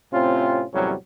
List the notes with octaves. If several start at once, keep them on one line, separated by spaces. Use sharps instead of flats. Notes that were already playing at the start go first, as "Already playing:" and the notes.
A2 C3 C4 C#4 F4
E2 A2 C3 F#3 G3 C#4